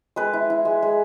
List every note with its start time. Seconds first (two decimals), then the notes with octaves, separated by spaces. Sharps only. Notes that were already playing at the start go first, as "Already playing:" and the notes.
0.16 G#3 B4
0.33 E4
0.50 E4
0.65 G#3
0.82 G#3